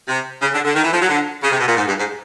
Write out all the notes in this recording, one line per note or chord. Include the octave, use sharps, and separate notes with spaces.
C3
C#3
D3
D3
D#3
E3
F3
F#3
D3
C#3
C3
B2
A#2
G#2
G2
G#2